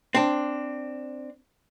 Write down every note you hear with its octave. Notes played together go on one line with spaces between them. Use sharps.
C4 D4